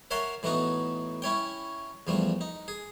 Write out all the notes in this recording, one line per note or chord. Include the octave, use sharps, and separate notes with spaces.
A#4 C#5 E5 F#5 A5 C6
A2 E3 A3 B3 D#4 F#4
C#4 E4 C#5 G5
E2 F3 G3 A3
D#4
G#4